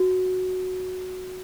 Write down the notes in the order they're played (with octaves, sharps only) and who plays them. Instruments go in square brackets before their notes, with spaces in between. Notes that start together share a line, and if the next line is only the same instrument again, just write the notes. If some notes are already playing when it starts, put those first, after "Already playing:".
Already playing: [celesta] F#4